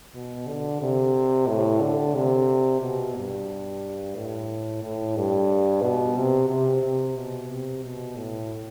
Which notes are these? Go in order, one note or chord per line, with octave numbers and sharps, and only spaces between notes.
B2
D3
C3
A2
D3
C3
B2
G2
A2
A2
G2
B2
C3
C3
C3
B2
C3
B2
A2